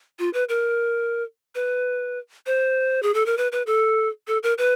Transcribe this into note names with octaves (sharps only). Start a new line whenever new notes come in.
F4
B4
A#4
B4
C5
G#4
A4
A#4
B4
B4
A4
A4
A#4
B4